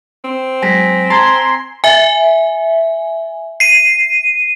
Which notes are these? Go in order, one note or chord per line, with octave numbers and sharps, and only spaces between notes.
C4
F#3 G#3 G#5 A#6 B6
A5 A#5 C6 G#6
E5 G#5
C7 D#7